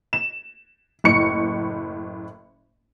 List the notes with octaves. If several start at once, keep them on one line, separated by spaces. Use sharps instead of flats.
E7
F#1 A2 C#6 C#7